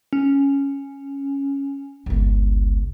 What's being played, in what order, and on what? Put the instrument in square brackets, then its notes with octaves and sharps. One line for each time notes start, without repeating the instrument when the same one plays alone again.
[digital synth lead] C#4
[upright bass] G1 C#2